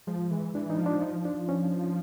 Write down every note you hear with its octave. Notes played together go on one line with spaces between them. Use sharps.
F3 G#3
E3 G#3
E3 D4
D#4
F3
D4
D#4
D4
C#4